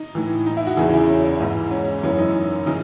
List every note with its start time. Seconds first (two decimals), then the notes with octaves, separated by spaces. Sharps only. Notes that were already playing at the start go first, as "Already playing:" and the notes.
Already playing: D#4
0.15 A2 E3
0.46 D#4
0.57 E4
0.66 F#4
0.77 E2 C#3 E3 G#4
0.93 E4
1.08 C#4
1.24 E4
1.40 G#2 E3
1.71 C#4
2.03 F#2 E3 C#4
2.19 D#4
2.66 C#3 E3 D#4